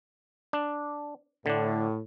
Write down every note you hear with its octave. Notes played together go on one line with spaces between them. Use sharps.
D4
A2 D3 D4